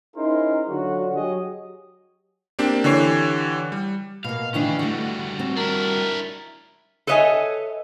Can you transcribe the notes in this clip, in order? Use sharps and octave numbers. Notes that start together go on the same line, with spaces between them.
C#4 D#4 E4 G#4 A#4 C5
D3 F#3 F4 F#4
F#3 G4 G#4 C#5 D#5
A#3 C4 D4 G4
D3 E3 G4 C#5 C7
G3
B2 A#3 F5
D#3 E3 C#4 D4 F5
D3 G3 A3 F#4
C4
D4 E4 A#4
A4 B4 C#5 D#5 E5 G#5